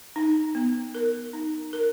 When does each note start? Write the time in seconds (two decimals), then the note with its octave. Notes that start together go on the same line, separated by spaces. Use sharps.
0.16 D#4
0.55 B3
0.95 A#4
1.33 D#4
1.73 A#4